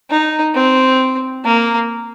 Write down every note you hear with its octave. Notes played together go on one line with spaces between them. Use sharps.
D#4
C4
A#3